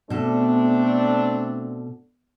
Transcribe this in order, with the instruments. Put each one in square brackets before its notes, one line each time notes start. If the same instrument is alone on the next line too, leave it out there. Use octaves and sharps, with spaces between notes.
[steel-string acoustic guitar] B2 A4 [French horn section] A3 C4 D4